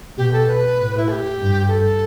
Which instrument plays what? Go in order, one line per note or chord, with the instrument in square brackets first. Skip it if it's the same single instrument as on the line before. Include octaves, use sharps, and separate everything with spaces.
[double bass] B2 [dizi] G4
[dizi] A4
B4
[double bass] A2
[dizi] E4
A4
G4
[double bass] G2
[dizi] A4